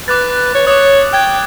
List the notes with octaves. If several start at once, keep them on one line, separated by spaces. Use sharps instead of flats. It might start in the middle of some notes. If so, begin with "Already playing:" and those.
B4 D6 F#6 A6
C#5
C#5 D6 D#6
G5 F#6 G#6